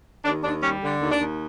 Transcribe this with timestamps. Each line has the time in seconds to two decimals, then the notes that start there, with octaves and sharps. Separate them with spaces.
0.25 D#2 D4
0.44 D#2 D4
0.63 G3 C#4
0.82 D3
1.01 D#2
1.10 D4
1.20 D#2